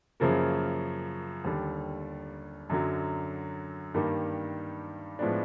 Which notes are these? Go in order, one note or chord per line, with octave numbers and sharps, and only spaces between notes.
F#2 C#3 F3 A#3
D#2 D3 G3
F#2 D3 F#3
G2 D#3 G3 A#3
A2 F3 G#3 B3 D4